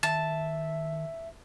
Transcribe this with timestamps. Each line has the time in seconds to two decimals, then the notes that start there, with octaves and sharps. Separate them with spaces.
0.03 D#3 E5 A5